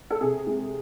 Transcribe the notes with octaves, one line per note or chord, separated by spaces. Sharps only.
A4
C3 G#4
G#3 G#4